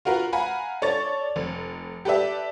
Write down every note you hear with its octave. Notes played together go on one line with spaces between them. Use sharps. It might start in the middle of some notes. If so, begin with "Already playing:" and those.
F4 F#4 A#4 B4
F5 F#5 G#5 A#5 B5
A4 C#5 D5 C#6 A6
F1
G4 A4 B4 D5 E5